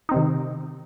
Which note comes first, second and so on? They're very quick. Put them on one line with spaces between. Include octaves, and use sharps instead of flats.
D#4 C4 C3 D#3